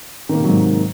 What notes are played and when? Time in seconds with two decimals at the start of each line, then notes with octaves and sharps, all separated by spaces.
0.29 D#3
0.34 A#3
0.39 C3
0.44 F#3
0.49 G#2